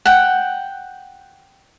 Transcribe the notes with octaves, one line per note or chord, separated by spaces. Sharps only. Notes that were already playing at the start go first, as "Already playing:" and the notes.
F#5 G5